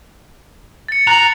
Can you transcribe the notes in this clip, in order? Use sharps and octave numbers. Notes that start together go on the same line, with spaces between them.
A6 C#7
A#5 F#6 A6 F#7